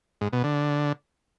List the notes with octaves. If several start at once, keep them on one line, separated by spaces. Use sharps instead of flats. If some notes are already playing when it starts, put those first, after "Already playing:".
G#2
B2
D3